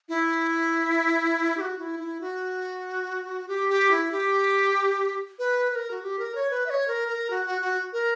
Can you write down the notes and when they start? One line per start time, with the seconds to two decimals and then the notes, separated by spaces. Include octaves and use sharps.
0.09 E4
1.57 G4
1.61 F#4
1.78 E4
1.99 E4
2.21 F#4
3.48 G4
3.69 G4
3.91 E4
4.11 G4
5.39 B4
5.71 B4
5.75 A#4
5.91 F#4
6.02 G4
6.19 A#4
6.35 C#5
6.50 B4
6.66 E5
6.70 C#5
6.87 A#4
7.08 A#4
7.30 F#4
7.46 F#4
7.61 F#4
7.93 A#4